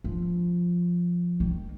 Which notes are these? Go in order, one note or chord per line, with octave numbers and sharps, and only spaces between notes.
F3
D#3